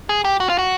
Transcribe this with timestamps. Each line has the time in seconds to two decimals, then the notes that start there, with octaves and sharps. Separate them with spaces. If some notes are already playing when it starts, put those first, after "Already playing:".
0.09 G#4
0.25 G4
0.40 F#4
0.49 F4
0.59 F#4